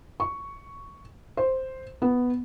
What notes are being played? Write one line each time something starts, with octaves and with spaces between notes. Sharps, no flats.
C#6
C5
B3